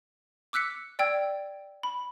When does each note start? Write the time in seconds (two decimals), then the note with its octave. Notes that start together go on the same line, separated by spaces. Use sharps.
0.53 D6 E6 F#6 B6 C#7
0.99 D5 G5 E6 G#6
1.83 B5